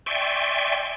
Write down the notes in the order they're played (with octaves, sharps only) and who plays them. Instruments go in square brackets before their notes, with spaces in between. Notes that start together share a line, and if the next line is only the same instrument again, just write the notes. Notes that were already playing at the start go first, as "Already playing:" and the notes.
[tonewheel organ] D5 E5 G5 G#5 C6 C#6